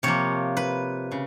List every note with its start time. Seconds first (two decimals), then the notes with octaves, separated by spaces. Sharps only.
0.03 C3 F3 A#3 C#5
0.57 B4
1.12 C#3